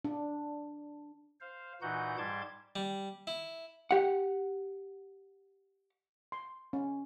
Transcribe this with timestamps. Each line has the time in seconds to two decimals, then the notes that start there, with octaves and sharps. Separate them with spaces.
0.05 D4
1.41 C5 F5
1.82 A#2 E3 D#4 F#4 F#5 G6
2.18 G#2 G3 A5 C6 D6 G#6
2.76 G3
3.27 E4
3.91 G4 F#5
6.32 C6
6.73 C#4